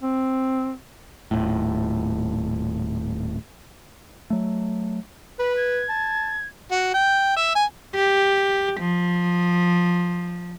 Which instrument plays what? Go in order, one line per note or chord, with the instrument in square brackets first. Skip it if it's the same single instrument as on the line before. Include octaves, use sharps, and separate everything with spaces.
[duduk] C4
[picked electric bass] D#1 A2
F#3 A3
[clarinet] B4 [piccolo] B5
[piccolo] G#6
[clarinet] A5
[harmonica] F#4
G5
E5
G#5
[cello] G4
F3